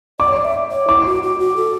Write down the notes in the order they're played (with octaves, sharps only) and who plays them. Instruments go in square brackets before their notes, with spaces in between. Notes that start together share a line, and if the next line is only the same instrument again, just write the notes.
[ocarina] D5 [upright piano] D6
[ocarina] C#5
D5
E5
C#5
[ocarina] E4 [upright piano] D6
[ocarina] F#4
F#4
F#4
A4